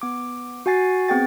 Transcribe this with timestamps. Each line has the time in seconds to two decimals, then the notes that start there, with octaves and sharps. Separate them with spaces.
0.02 B3 D6
0.66 F#4 F#5 G#5 A6 C7
1.08 B3 C4 G#4 G5 A6